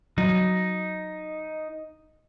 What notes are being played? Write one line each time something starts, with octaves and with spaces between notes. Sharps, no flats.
F#3 D#4